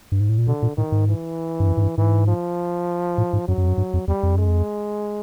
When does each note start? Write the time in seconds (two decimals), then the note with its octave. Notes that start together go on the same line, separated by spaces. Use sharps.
0.12 G2
0.20 G#2
0.29 A2
0.38 A#2
0.47 B2 D3
0.63 A#2
0.77 A2 D#3
0.92 G#2
1.08 E3
1.60 G2
1.67 F#2
1.77 G#2
1.83 G2
1.98 G#2 E3
2.27 F3
3.18 A2
3.33 G#2
3.48 F#2 F#3
3.58 F#2
3.63 F2
3.68 F#2
3.78 G2
3.94 F2
4.08 E2 G3
4.23 F2
4.35 F#2 G#3
4.47 F2